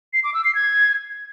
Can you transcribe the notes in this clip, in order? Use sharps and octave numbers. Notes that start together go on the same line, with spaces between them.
C7
D6
E6
C7
G#6